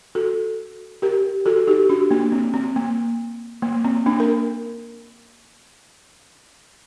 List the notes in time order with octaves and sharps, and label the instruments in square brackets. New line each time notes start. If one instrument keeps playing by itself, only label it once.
[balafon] F#4 A4
G4 A#4
F#4 A4
D#4 G4
D4 F#4
A#3 D4
C4
C4
A#3
A#3
C4
A#3 D4
A#4